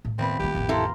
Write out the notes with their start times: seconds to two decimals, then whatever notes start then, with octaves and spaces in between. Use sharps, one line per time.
0.05 A2
0.18 D#1 B3 C4 B5
0.40 F3 A#3 G4
0.55 A1 F2
0.69 E4 A4 F5 A#5 C6